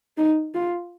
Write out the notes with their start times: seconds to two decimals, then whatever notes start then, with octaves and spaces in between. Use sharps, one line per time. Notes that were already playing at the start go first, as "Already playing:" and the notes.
0.17 D#4
0.55 F4